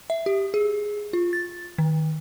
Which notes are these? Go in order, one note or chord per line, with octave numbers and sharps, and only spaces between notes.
E5
G4
G#4
F4
A6
D#3